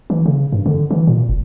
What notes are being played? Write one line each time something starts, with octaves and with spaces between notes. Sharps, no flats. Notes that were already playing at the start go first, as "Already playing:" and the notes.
E3
C#3
G2
D3
E3
A#2
F1